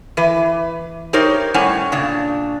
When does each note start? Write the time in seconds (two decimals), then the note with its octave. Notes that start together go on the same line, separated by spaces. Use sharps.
0.17 E3 B4
1.13 D#4 G4 A#4 C5 C#5
1.54 A2 G3 C#4 C#5 F#5 G#5
1.92 A#2 C#3 D4